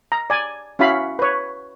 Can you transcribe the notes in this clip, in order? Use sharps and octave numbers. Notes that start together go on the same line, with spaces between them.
A#5
D5 G#5
C#4 E4 F#4 F5 B5
B4 C#5